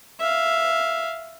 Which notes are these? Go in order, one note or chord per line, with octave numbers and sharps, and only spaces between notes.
E5 F5